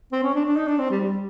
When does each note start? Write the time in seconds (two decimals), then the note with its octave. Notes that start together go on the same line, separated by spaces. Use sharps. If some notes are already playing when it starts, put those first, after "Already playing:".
0.12 C4
0.23 C#4
0.35 D4
0.46 D4
0.57 D#4
0.68 D4
0.79 C4
0.90 G3
1.01 G3